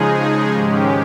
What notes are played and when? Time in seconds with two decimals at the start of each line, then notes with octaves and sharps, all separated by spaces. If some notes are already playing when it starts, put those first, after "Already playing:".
Already playing: C#3 F3 G#3 D#4 G#4
0.51 G#2 D#3 G#3 C#4 G4